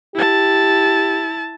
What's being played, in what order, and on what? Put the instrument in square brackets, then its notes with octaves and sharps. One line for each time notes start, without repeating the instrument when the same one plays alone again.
[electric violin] E4 A5 [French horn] G4